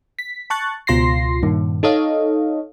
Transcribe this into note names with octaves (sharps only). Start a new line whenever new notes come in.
B6
A5 C#6 F#6 A6
C#2 B2 F4 C6 A#6 C7
G2 A#2 D#3
D#4 A4 C#5 D#5 F5